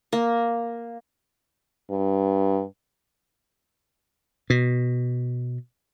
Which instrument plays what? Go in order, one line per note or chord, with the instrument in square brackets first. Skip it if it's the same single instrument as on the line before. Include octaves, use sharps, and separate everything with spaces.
[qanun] A#3
[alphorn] G2
[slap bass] B2